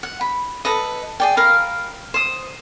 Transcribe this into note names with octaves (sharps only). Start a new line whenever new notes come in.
F#5
B5
A4 B4 D#5
G#4 D5 G5
A#4 F5 B5
C5 D#6